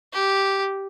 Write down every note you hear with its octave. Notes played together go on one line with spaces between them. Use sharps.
G4